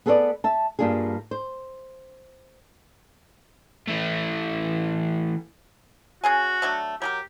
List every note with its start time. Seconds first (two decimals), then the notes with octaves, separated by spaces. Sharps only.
0.06 B3 G#4 A4 B4 C#5 D5
0.44 E5 A5
0.79 G2 G3 A#3 D4 F4 G#4
1.31 C5
3.88 E3 A3
6.24 C#4 F#4 G#4 G#5
6.62 F#3 A3 D4
7.02 F#3 G4 G#4 A#4